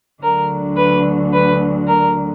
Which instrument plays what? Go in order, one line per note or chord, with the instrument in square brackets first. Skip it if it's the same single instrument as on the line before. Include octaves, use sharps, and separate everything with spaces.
[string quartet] D2 D3 F#3 A#4
B4
B4
A#4